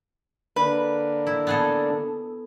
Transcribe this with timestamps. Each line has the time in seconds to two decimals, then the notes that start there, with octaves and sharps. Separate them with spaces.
0.56 D3 A#3 D4 B4
1.27 E4
1.47 B3 G#4 A4